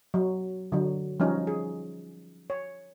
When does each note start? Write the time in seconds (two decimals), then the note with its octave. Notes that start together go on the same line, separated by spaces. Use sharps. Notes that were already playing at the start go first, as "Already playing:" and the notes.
0.14 F#3
0.72 D3 F#3
1.20 F3 G3 C#4 D#4
1.47 G#4
2.50 C#5